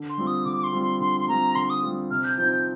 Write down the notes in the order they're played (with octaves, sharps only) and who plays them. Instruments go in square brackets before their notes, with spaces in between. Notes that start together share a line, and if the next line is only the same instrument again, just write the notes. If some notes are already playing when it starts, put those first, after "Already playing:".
Already playing: [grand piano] D3
[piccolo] C6
[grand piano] G3 C4 F4
[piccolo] D#6
[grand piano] D3 [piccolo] D6
[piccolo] D6
C6
[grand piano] G3 C4 F4
[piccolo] C6
[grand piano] D3 [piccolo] C6
[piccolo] C6
[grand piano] G3 C4 F4 [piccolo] A#5
[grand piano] D3 [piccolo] C6
[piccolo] D#6
[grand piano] G3 C4 F4
[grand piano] C3 [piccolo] F6
[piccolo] G6
[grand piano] F3 C4 D#4 [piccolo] G6
[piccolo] G6